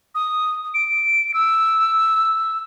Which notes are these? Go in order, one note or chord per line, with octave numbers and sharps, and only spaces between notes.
D#6
D7
E6